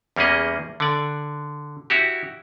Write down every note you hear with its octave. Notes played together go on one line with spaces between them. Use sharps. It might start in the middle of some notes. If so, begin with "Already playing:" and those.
E2 G3 A#3 C#4 G#4 D#5
D3 D5
E4 F#4 G4